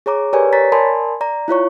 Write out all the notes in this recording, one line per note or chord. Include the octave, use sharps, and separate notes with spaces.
G#4 C#5 A#5 D6
G4 A#4 B4 C#5 D5 G#5
C#5 A#5 A6 B6
A#4 D5 G#5 A5 B5 C6
D5 A#5
E4 F4 C#5 C#6